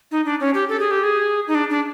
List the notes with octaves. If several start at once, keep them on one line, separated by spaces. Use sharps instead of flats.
D#4
D4
C#4
G4
A4
G#4
G4
G#4
D#4
D4
D4